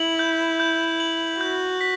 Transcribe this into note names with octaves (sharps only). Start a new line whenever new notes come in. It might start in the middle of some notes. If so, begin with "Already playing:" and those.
Already playing: E4 F#7
G6
G6
F#7
F#4 G6
B6